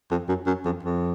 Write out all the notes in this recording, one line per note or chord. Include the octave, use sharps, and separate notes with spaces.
F2
F#2
F#2
F2
F2